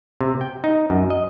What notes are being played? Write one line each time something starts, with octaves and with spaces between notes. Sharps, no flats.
C3
G5
D#4
F#2
D#5